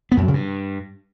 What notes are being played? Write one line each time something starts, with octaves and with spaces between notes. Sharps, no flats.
B3
F#2
F#3
C#3
G2